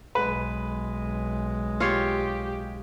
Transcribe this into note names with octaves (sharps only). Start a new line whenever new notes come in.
B1 G#3 B4
F4 G4 C#5